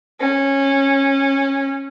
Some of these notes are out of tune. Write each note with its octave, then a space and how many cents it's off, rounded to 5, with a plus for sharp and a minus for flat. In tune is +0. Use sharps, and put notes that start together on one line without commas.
C#4 -15